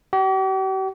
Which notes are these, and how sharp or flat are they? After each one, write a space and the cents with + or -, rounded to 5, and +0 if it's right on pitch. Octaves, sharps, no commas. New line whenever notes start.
G4 -45